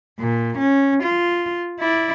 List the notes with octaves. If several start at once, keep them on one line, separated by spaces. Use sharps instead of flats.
A#2
C#4
F4
E4 D5